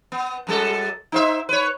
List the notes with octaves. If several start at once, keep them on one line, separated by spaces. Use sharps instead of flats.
B3
F#2 G3 A4
D#4 C5 E5
B4 C#5